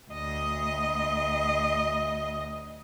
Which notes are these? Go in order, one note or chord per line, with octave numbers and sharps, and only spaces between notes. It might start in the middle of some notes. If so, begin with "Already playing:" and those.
D2 D#5